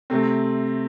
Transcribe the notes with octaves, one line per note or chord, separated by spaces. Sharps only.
C3 A3 C4